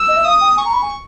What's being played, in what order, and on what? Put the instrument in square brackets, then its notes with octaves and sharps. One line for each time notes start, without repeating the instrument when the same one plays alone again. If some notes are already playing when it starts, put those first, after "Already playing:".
Already playing: [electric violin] E6
[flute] D#5
E5
[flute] F5 [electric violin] D#6
[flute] G5
[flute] G#5 [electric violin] C#6
[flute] A#5
B5
G#5